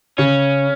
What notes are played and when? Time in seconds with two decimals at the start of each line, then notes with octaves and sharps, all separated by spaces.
0.18 C#3 C#4